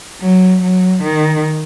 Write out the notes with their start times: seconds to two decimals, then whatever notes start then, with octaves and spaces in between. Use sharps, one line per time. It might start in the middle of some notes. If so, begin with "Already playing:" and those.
0.21 F#3
0.62 F#3
1.03 D#3